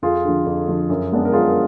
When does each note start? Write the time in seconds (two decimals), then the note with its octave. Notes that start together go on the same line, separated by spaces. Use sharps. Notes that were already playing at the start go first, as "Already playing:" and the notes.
0.02 F2 F4 G#4
0.24 D3 F3
0.46 F2
0.68 D3 F3
0.90 F#2
1.12 D3 G#3 B3 D4
1.25 A#4
1.32 F#2 F4 G#4